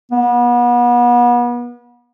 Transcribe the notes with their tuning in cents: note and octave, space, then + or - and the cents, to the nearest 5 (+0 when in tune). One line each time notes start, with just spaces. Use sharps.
B3 -35